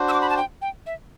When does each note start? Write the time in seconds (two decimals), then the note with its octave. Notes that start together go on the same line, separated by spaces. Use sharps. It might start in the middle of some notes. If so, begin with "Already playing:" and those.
Already playing: D4 F#4 C5
0.08 E6
0.13 D6
0.21 B5
0.29 A5
0.37 G5
0.62 G5
0.86 E5